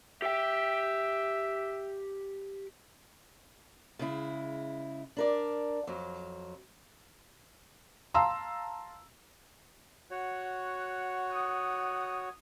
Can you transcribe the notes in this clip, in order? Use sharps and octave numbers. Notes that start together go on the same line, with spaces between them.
G4 E5 G5
C#3 G#3 E4
D4 A#4 D5
F2 F#3
F5 A5 A#5 C6 E6
F#4 C#5 F#5
D#3 F#5 D#6